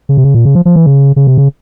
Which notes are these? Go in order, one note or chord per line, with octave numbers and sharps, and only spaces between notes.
C#3
C3
C#3
A#2
C#3
F3
F3
E3
C#3
C#3
C3
C#3